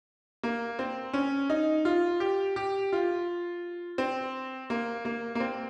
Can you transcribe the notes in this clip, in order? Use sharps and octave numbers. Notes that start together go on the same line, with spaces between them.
A#3
C4
C#4
D#4
F4
G4
G4
F4
C4
A#3
A#3
A#3
C4